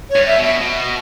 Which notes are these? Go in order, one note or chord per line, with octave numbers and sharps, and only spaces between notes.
C#5
G2
E5
B2
E5
B2